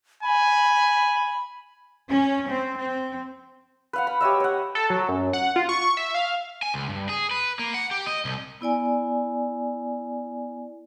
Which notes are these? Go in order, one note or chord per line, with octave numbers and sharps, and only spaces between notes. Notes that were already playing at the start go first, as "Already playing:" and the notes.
G#5 B5
C#4
C4
C4
B4 F5 F#5
B5
G4 C#5 D#5 E5
C#5 F#5
A4
F#3
F#2
F#5
F4
C#6
E5
F5
G#5
C#2
G2
G#4
B4
A#3
F#5
G4
D#5
C2
B3 E4 D5 G#5